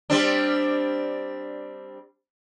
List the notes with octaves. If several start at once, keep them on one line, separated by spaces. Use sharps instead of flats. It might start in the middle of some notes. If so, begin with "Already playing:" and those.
G3 C4 D4